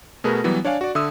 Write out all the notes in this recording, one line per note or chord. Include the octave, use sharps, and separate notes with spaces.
B2 A3 G#4 A#4 B4
E3 F#3 G3 B3
D4 C#5 D5 F5 G#5
F#4 D5
D3 E5 D#6 E6